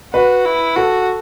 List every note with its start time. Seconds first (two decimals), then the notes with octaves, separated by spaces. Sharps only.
0.14 F#4 B4
0.45 E4
0.76 F#4 A4